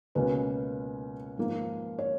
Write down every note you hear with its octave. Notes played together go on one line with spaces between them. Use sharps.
C#2 B2 A#3 C#4 B4
G#2 F3 A#3
C#5